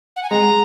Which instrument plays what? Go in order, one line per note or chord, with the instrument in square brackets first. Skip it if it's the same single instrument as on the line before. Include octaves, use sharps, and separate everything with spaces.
[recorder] F#5
G#5
[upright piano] G#3 [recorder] A#5